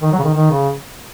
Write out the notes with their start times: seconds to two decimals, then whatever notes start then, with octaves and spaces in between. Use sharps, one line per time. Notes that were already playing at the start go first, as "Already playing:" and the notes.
0.02 D#3
0.12 F#3
0.19 C#3
0.24 D#3
0.34 D#3
0.51 C#3